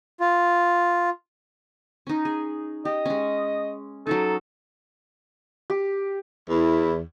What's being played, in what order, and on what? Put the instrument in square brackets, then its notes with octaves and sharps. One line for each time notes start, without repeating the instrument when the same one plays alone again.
[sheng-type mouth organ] F4
[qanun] C#4 D#4
G#4
[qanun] G4 [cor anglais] D#5
[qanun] G#3 C#4
[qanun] F#3 C#4 D#4 [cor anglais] A4
[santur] G4
[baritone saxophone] E2 [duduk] E4